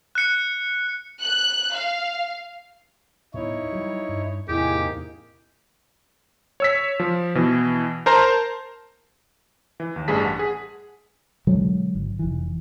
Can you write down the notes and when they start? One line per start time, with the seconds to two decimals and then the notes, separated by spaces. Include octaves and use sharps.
0.15 F#6 C#7
1.22 F#6
1.75 F5
3.34 D#1 A2 B3 D#4 E4 C#5
3.72 F#3 G3
4.07 G2 D4
4.49 E2 A2 C3 A#3 D#4 E4 G4 G#4
6.60 C#5 E6 B6
7.00 F3
7.35 B2 E3
8.06 A#4 C5 A5 A#5 C6
9.80 E3
9.96 D#2
10.08 A1 G2 A3 G#4 A5 B6
10.26 F#5
10.39 G#4
11.47 B2 D3 F#3 G#3
11.95 G#1
12.19 F1 E3